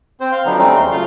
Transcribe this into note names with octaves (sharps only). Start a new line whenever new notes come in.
C4 C5
F5 C6
D3 F3 F#3 B3 D4 D#4
G3 A3 C4 C#4 D#4
D#2 G#3 C6
C#3 F#3 A3 F4 F5 C6